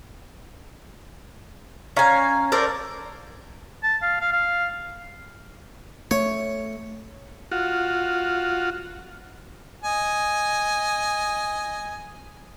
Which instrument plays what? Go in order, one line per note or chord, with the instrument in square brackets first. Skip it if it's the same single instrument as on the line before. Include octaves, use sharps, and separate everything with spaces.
[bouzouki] C#4 G#5 [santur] F5 A#5
[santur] A4 [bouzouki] A#4 C5 D5
[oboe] A5
F5
F5
F5
[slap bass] A3 [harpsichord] C#5
[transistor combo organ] F4 F#4
[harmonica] D#5 G#5